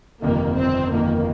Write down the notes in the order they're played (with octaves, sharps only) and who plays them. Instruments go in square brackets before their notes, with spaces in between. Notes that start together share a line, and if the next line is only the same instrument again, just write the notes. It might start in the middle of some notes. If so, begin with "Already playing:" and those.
[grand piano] G1 F2 C3 D#3 [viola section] A#3
[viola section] C4
[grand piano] G1 F2 D#3 [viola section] A#3